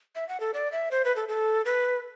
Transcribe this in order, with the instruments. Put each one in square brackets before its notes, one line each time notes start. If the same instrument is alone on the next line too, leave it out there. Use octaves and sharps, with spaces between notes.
[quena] E5
F#5
A4
D5
E5
C5
B4
A4
A4
B4